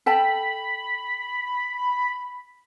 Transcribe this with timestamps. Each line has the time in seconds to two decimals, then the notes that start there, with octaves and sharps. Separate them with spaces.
0.06 A4 G5 A5 B5